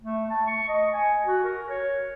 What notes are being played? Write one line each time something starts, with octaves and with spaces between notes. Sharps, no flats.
A3
A5
C#6
D#5
G#5
F#4
A#4
C#5